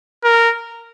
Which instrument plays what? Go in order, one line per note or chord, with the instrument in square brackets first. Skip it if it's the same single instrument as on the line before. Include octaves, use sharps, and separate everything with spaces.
[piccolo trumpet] A#4